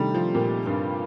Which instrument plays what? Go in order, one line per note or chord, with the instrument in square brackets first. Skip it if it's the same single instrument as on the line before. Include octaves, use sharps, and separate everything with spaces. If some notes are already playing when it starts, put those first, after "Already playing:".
Already playing: [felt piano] C3 D#3 A3 D4 G4 [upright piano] G3
[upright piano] F3
A#2
G2